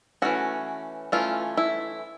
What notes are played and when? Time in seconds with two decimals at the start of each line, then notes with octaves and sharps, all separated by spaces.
0.22 E3 A3 C#4 F#4
1.12 E3 A3 C#4 F4
1.57 E4